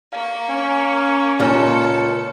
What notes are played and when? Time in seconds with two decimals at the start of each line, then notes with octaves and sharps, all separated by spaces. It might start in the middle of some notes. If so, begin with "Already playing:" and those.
0.13 A#3 F5 C#6
0.50 C#4
1.40 C#2 A#2 A4 C#5 F6 C#7